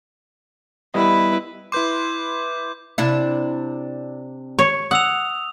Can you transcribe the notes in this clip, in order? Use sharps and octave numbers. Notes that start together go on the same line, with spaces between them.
G3 B3 E4 B4 D#5
E4 B4 C6 D6 G6
C3 D4 E4
C#5
F#5 D#6 E6 F7